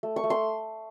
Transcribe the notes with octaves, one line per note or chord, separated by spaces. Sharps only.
A3
C#6
A3
C6